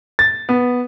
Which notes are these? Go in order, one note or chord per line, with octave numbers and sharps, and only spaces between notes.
A6
B3